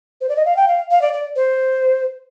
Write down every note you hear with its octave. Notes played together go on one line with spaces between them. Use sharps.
C5
D5
D#5
F5
G5
F5
F5
D5
D5
C5